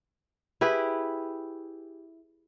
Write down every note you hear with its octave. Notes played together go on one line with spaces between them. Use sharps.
E4 G4 G#4 B4